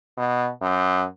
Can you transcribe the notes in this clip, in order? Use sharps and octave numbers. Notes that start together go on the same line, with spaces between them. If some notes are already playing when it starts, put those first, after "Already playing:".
B2
F#2